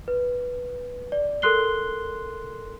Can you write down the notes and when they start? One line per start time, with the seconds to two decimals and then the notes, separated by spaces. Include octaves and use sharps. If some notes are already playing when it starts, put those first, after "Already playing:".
0.08 B4
1.12 D5
1.42 A4 A#4 C6 F#6 C7 G7